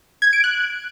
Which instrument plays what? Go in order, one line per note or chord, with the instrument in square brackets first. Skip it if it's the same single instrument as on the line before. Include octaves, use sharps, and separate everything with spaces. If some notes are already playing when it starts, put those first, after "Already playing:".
[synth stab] G#6
D7
F#6